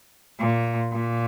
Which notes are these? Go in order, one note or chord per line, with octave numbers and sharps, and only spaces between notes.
A#2
A#2